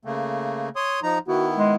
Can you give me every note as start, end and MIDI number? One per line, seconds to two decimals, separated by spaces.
0.05 0.69 49
0.05 0.69 57
0.05 0.69 58
0.76 1.00 73
0.76 1.00 84
0.76 1.00 87
1.03 1.18 53
1.03 1.18 63
1.03 1.18 82
1.28 1.76 51
1.28 1.76 59
1.28 1.76 64
1.28 1.47 66
1.56 1.74 56